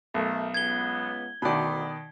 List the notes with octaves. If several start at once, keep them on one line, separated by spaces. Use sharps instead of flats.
B1 A3 A#4
C#2 B3 G#6 G7
D2 B2 D#3 D5 B5